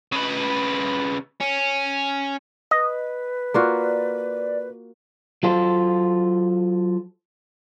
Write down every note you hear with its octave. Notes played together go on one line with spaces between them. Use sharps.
C#3 B4
C#4
B4 D#5
A#3 F4 F#4 D5
F#3 F4 A4 C5